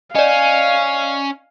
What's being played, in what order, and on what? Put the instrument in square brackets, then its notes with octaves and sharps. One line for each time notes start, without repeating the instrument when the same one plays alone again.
[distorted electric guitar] C#4 [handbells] D5 D#5 [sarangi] F5 [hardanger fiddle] G#5